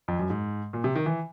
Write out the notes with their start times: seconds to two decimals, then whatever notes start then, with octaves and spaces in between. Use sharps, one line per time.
0.08 F2
0.19 F#2
0.30 G#2
0.73 A#2
0.84 C3
0.95 D#3
1.06 E3